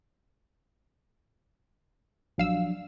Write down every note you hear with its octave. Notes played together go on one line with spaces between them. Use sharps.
A#1 F3 F#3 D4 F5 E6